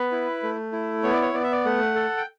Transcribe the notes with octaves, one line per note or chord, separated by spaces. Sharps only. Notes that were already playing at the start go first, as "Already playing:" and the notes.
Already playing: B3 B4
E4
A3
E4
B3 C#5
D5
C#5
B3 D5
E5
D5
A3 F#5
A4
G5